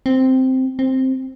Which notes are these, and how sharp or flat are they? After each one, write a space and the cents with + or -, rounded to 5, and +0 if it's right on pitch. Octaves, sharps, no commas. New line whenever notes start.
C4 -5
C4 +5